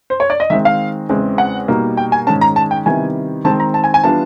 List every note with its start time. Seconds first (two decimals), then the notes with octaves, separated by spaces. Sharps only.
0.10 C5
0.20 C#5
0.30 D5
0.40 D#5
0.50 D#3 G#3 C4 E5
0.65 F5
1.09 E2 C#3 E3 G#3 C4
1.38 F#5
1.68 B2 G3 A#3 D#4
1.97 G5
2.12 G#5
2.27 G#2 D#3 G#3 C#4 A5
2.41 A#5
2.56 A5
2.71 G5
2.86 C3 D#3 G3 B3 E4 G#5
3.45 D#3 G#3 C4 A5
3.60 A#5
3.74 A5
3.84 G#5
3.94 G#5
4.04 E3 G3 B3 D4 F4 A5